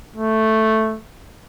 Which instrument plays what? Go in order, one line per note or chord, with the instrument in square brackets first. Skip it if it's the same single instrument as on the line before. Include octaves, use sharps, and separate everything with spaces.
[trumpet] A3